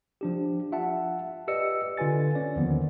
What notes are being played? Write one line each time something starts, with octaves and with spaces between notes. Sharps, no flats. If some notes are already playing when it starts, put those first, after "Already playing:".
F3 D4 G4
F4 E5 F#5 A5
G4 B4 D5 D#5 E6 C#7
D3 F4 B4 G#5 A6
C#4 D5
D#2 D3 D#3 F3 B3